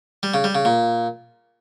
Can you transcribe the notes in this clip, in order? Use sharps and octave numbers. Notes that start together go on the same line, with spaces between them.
G3
C#3
G3
C#3
A#2